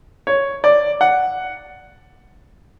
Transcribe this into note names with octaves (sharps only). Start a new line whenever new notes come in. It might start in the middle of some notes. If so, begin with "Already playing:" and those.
C#5
D5
F#5